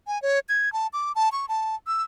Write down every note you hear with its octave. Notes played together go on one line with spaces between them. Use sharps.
G#5
C#5
G#6
A5
D6
A5
C#6
A5
E6